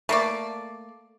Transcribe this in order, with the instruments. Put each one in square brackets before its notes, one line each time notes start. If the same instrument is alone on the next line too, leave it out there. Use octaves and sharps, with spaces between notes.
[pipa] A3 A#3 D5